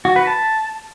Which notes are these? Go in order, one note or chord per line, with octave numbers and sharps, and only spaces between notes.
F#4
B4
A5